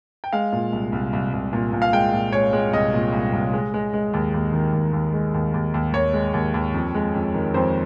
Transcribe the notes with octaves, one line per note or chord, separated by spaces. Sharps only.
G5
G#3 F5
A#2
C2
C2
C2
C2
A#2
A#2
F5
G#3 G5
A#2
G#3 C#5
G#3
C2 D#5
A#2
C2
C2
G#3
G#3
G#3
D#2
D#2
D#3
D#2
D#2
G#3
D#2
D#2
D#2
D#2 C#5
G#3
D#2
D#2
F2
G#3
F2
D#3
F2 C5